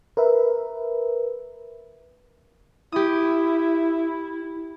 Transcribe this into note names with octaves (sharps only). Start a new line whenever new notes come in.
A#4 B4 E5
E4 G4 D#6